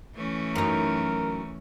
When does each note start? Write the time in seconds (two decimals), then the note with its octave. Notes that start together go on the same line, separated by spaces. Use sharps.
0.15 E3 A3 C#4
0.56 F#2 D#4 A#4